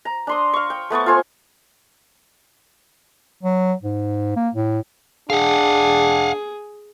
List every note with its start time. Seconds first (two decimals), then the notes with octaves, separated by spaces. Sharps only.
0.05 A#5
0.27 D4 C6 D#6
0.53 F5 C#6
0.70 G5
0.90 A3 B3 A5 C#6
1.06 F4 A4 C5 G#5
3.43 F#3
3.83 G#2
4.36 A#3
4.54 A2
5.30 D4 G#4 F5 F#5